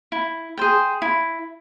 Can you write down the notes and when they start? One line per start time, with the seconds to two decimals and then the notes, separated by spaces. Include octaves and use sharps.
0.12 E4
0.58 G#4 C5 G5
1.02 E4